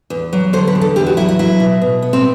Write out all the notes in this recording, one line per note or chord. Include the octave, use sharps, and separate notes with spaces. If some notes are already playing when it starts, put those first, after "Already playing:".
E2
F#3
D3 C5
B4
E2
A4
E2 G4
F#4
F#3 E4
E4
F#3 E4
B2
B2
B3
C4